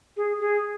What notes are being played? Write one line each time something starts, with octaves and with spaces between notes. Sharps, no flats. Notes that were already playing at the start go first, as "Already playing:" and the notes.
G#4
G#4